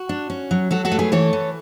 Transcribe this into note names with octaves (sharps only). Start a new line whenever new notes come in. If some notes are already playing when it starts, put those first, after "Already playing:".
Already playing: F#4
D4
C#4
F#3
F#3 F#4 A4
F#4 A4
A3
G#4 B4
E3 A4 C#5
E3